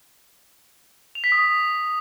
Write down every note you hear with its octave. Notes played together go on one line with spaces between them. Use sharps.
F7
B6
D#6